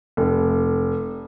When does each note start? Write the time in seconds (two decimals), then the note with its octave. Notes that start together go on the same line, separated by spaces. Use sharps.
0.17 F1